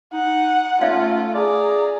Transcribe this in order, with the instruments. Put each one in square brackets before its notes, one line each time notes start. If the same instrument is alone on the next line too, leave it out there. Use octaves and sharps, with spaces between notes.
[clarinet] D#4 [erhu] F#5
[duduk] A3 [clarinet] C#4 [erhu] F4 [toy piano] E5 F5
[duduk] G#4 [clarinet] D5 [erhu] A#5